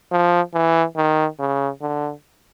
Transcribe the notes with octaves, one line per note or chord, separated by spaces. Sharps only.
F3
E3
D#3
C#3
D3